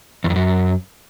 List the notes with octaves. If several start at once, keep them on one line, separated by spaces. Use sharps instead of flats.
E2
F2
F#2